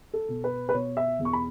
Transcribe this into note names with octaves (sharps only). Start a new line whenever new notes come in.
A4
B2
B4
B4
B2 C#5
E5
E2
C#6
B5